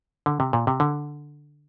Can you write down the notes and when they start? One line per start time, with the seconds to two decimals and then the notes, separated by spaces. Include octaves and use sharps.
0.26 D3
0.40 C3
0.53 A#2
0.67 C3
0.80 D3